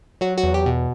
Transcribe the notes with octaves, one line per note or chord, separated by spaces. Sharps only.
F#3 F#4
F#4
E2
G4
B2